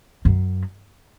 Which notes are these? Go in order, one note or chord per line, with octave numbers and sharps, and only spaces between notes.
F#2